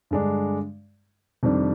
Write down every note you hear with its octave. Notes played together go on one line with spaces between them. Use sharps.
G2 D3 G#3 D4
F2 C3 D#3 G3 D4